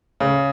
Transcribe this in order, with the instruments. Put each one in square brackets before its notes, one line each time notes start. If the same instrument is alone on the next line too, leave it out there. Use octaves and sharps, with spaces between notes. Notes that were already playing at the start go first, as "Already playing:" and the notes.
[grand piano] C#3